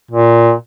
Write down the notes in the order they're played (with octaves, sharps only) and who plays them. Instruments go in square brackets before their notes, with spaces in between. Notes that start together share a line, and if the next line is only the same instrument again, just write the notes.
[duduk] A#2